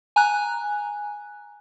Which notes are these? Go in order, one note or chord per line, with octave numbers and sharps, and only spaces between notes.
G#5 A#5 F#6